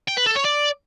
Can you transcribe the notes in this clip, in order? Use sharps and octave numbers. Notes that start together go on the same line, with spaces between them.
G5
B4
A4
C#5
D5